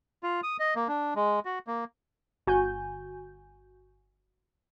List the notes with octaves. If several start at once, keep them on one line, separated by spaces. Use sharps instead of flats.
F4
D#6
D#5
A#3
D4
G#3
F#4
A#3
G1 F#4 G#5 G6